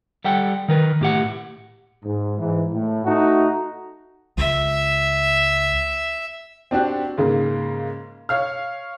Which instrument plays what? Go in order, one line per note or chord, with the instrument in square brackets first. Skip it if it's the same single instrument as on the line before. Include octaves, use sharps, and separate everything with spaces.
[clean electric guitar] G3 A4 F#5 G5
D#3 A#4 B4
A2 G4 F#5
[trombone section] G#2
G#2 E3
A2
A3 D#4 F#4
[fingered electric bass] C#2 [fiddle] E5
[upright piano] C4 D4 F#4 G4
G#2 C#3 A#3
C#5 F5 F6